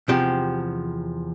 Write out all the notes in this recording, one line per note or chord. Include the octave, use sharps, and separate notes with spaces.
E2 C3 F3 G4